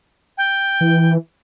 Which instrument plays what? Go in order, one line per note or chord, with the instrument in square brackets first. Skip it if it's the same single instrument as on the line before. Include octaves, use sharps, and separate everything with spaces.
[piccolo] G5
[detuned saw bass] E3